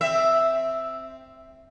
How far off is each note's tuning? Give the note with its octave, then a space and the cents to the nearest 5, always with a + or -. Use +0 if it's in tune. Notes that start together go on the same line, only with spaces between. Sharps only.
C4 +0 E5 +0